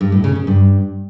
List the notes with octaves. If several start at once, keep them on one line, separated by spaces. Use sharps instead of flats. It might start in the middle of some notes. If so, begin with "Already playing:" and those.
G2
A2
C#3
C#3
G2